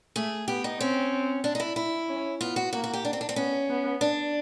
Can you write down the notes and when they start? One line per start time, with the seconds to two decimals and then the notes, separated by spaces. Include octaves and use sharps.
0.16 A3 G#4
0.48 B3 G4
0.64 D#4
0.80 C4 C#4
1.44 D4
1.55 D#4
1.60 E4
1.76 E4
2.09 C#4
2.41 B3 F4
2.56 F#4
2.73 A#3 F#4
2.84 F#4
2.93 G4
3.05 D4
3.13 C4
3.21 D4
3.29 C4
3.36 B3 C#4
3.69 B3
4.01 D4